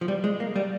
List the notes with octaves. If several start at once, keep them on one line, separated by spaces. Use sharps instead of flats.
F3
G3
G#3
A#3
G3